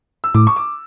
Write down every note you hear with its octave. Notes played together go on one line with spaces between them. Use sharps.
E6
A2 D6
C#6
D6